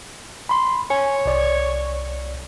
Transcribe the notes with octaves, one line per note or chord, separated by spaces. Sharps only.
B5 C6
C#5 G#5
C2 D5